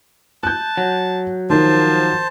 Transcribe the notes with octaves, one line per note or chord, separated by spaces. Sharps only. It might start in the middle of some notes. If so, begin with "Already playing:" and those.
A5 F#6 G6
F#3
D#3 F3 A#4 C5 A5